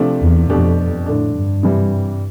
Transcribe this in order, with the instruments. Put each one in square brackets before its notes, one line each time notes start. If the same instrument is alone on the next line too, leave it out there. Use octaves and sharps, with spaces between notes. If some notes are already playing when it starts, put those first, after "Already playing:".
Already playing: [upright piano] C3 F3 A3 D4
[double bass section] E2
[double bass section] F2 [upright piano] B2 A3 D4 G4
[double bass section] A2 [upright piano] D3 A3 D4
[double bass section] G2
[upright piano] C3 E3 G3